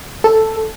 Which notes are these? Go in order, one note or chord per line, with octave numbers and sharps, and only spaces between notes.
A4